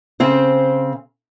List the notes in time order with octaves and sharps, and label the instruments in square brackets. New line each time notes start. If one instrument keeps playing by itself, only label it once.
[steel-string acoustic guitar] C#3 C4 C5